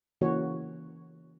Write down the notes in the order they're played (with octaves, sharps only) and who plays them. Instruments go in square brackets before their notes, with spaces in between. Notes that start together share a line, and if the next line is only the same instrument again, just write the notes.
[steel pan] C#3 E3 A#3 F#4 C#5